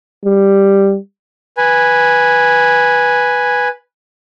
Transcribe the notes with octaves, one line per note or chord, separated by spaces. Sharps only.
G3
B4 G#5